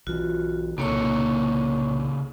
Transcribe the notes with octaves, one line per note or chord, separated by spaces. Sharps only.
B1 E3 F4 F#4
C2 A#2 C#3 A#3 D#4 A4 C#5 C#6